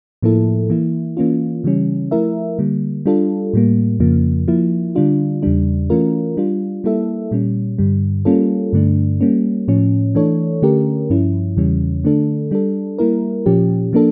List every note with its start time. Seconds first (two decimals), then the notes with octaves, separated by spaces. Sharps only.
0.22 A2 F3 A#3 E4 A4
0.70 E3 A#3 E4
1.17 E3 A#3 C#4 F4
1.64 C#3 E3 G3 C#4
2.11 F3 A3 E4 A#4 E5
2.59 D3 G3 A#3
3.06 G3 D4 F4 A4
3.53 A2 G3 A#3
4.00 F2 C#3 F3 A#3
4.48 F3 A#3 E4
4.95 D3 G3 D4 F4
5.43 E2 C#3 G3 D4
5.90 E3 A3 C#4 F4 A#4
6.37 G3 D4 F4
6.84 G3 A#3 E4 A4 E5
7.31 A#2 G3 C#4
7.78 G2 D3 G3
8.25 G3 A#3 C#4 F4 A4
8.73 G2 D3 A3 D4
9.21 G3 A#3 C#4
9.68 A2 F3 C#4
10.15 E3 A3 D4 A4 C#5
10.62 D3 A3 C#4 G4 A#4
11.10 G2 F3 C#4 E4
11.57 E2 C#3 E3 G3 C#4
12.04 D3 A3 D4 A4
12.51 G3 D4 A4
12.99 G3 A#3 E4 A#4
13.46 A#2 F3 C#4 G4
13.93 F3 A#3 D4 A4